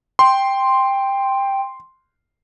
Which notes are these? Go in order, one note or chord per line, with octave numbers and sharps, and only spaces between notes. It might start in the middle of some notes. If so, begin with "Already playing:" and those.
G5 C6